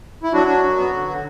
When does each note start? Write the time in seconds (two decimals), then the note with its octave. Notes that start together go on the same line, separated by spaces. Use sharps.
0.23 E4
0.33 F#3 D4 F#4
0.47 D4
0.63 F#2
0.78 B3
0.93 D3
1.08 D3